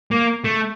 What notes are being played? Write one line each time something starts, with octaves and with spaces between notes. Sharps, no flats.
A#3
A3